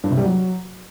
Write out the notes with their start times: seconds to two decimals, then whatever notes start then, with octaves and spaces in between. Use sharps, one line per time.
0.04 G2
0.11 C3
0.17 G3
0.24 F#3